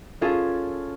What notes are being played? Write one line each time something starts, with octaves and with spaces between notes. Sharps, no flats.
C#4 F4 G#4 A4